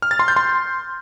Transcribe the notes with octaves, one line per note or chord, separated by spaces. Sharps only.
F6
A6
C6
G6
C6